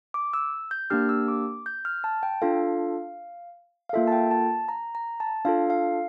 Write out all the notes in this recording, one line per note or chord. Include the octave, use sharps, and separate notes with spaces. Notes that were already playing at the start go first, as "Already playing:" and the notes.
D6
E6
G6
A#3 D4 G4 F6
E6
D6
G6
F6
A5
G5
D4 F4 A4 F5
F5
A#3 F4 A4 E5
A5
G5
A5
A#5
A#5
A5
D4 F4 A4 F5
F5